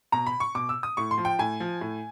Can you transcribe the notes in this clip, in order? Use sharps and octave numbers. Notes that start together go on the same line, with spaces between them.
B2 A#5
B5
C#6
B2 D6
E6
D#6
A2 C#6
C6
F3
G5
A2 G#5
F3
A2